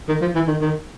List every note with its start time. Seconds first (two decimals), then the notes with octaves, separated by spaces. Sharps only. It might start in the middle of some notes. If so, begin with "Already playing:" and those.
0.09 D#3
0.21 F3
0.35 E3
0.47 D#3
0.61 D#3